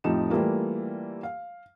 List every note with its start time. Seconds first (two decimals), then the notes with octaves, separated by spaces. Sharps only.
0.04 F2 A2 F3 D#4 G4 E7
0.30 E3 G3 A3 A#3 F4
1.23 F5